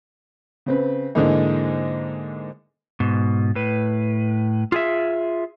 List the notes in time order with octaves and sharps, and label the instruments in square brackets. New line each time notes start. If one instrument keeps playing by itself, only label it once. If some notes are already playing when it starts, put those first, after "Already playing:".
[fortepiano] C#3 C4 B4
G#2 D3 E3 G#3 A#3 D#4
[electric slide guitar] G#2 B2
A2 B4
F4 G#4 E5